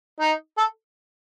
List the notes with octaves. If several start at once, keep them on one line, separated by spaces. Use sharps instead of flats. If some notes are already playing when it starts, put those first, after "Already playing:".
D#4
A4